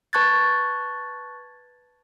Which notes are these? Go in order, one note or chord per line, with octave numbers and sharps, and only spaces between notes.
B4 A5 C#6 F#6 G#6 A6